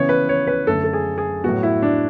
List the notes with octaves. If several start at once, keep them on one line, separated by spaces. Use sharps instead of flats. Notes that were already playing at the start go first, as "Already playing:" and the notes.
Already playing: C#3 E3 B3 C#5
B4
C#5
B4
F#2 D3 A3 A4
A4
G#4
G#4
A2 F#3 B3 F#4
E4
D4